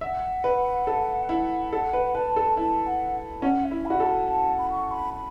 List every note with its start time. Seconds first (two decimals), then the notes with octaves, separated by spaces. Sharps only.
0.01 E5 F#5
0.44 B4
0.87 A4
1.29 E4
1.73 A4 F#5
1.93 B4
2.15 B4 A5
2.36 A4
2.57 E4 A5
2.86 F#5
3.42 C#4 F#5
3.64 E5
3.71 E4
3.86 F#4 B5
4.00 A4
4.06 A5
4.28 A5
4.58 B5
4.71 C#6
4.91 B5
5.14 B5